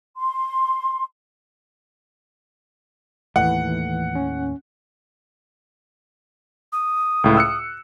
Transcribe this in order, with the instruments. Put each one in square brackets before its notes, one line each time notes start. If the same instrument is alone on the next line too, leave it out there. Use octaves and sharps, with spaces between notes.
[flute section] C6
[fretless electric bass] D#2 A2 A3 [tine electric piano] E3 [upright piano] F#5
[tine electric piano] C#4
[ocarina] D#6
[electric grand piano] C#2 A2
E6 F#6 C#7